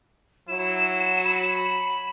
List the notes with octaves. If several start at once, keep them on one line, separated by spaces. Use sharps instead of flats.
F#3 E4 E7
B5